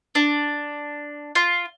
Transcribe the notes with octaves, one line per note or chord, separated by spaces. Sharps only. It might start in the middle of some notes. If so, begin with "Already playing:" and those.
D4
F4